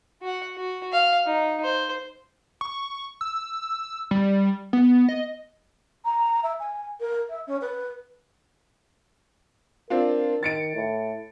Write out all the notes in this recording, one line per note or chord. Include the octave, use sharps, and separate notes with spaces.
F#4 F#5
F#4
F5
D#4
C5
C#6
E6
G3
B3
D#5
A#5
E5
G#5
A#4
E5
C#4
B4
C4 D4 F4 A#4
D#3 A6 C#7 D7
A2